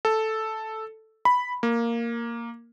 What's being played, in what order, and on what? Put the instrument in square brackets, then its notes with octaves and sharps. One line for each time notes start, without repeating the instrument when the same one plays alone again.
[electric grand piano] A4
B5
A#3